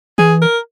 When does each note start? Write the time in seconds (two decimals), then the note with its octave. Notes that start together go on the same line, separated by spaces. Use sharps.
0.18 E3 G#4
0.42 A#4